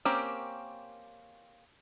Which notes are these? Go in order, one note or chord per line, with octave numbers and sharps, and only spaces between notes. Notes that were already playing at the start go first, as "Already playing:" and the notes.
A#3 C4 C#4 G4 A#4